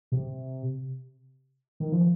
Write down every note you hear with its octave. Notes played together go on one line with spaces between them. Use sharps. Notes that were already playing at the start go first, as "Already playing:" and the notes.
C3
D#3
F3